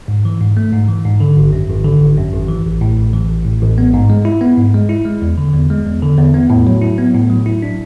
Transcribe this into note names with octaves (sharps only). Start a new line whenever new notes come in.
G#2
E3
G#2
A3
G#2
E3
G#2
D3
G#1
F#2
G#1
D3
G#1
F#2
G#1
E3
A1
A2
A1
E3
A1
A2
A1
B3
G#2
G#3
E4
B3
G#2
G#3
E4
G#3
E2
D3
E2
G#3
E2
D3
E2
B3
A2
F#3
E4
B3
A2
F#3
E4
D4